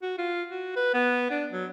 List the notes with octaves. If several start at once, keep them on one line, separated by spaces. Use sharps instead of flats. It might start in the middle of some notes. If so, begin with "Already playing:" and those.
F#4
F4
F#4
B4
B3
D4
F#3